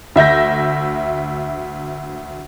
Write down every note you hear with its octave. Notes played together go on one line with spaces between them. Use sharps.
D2 E5 G6 A#6